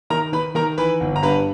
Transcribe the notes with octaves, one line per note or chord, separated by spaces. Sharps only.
D#3 A#4 A#5
D#3 B4 B5
D#3 A#4 A#5
E3 B4 B5
G1
A#5
G2 B4 B5